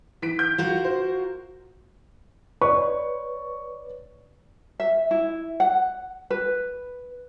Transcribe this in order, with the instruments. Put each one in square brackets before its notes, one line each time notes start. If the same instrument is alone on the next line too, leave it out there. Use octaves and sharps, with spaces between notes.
[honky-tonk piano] E3 B6 D7
G6
[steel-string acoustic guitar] F4 F#4 A#4
[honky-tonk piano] C5
[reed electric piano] B4 C#5 [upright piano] D5 C#6
[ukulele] E5
E4
F#5
B4